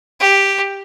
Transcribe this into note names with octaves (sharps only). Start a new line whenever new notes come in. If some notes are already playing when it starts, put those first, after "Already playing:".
G4